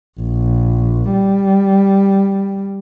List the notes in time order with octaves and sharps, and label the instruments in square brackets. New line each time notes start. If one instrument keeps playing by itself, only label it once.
[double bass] A#1
G3